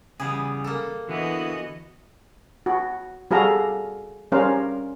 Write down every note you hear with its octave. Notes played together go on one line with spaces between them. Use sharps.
C#3 E3 G3 B3 G#4
A#3 A4
D3 E3 B3 F#4 D#5
F#4
G3 F#4 G#4 A4 F5 A#5
G3 C#4 A#4 C5 F5